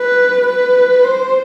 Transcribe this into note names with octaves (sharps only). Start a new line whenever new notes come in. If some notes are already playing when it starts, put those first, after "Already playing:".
Already playing: B4
B4
C5